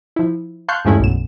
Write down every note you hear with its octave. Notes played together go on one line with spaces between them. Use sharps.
F3 E4
F5 A5 C6 C#6 F#6 G6
E2 G2 G#3 A3 C#4 E4
B1 F#2 E7